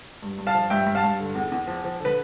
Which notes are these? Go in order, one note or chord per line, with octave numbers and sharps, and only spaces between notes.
G2
G2
F5 A5
F3
G2 E5 G5
G2
F5 A5
G2
D3
E2
E2
F3
F3
D3
B4